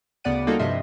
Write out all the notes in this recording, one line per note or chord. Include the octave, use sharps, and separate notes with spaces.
D2 C#3 B3 D5 F#5 D#7
G3 A#3 D#4 F4 F#4 A4
G2 C3 F3 D#5 E5 C6